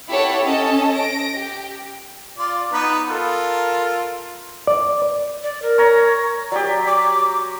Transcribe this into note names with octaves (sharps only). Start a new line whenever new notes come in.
E4 G4 A4 C#5 F#5
C#4 A4 D#5 A5
A#6 D7
G4
F4 D5
B3 D#4 B4
F4 A4 A#4
D5
D5
A#4
C#5 A#5
F#3 G4 D5
D6